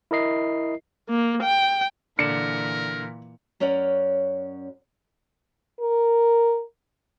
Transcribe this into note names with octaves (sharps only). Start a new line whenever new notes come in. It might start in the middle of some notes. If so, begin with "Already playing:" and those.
E4 A#4 D#5 C7
A#3
G5
A#2 D3 E3 A#4 D5 C#7 E7
F#2 C#4 C#5 D5 F#5
A#4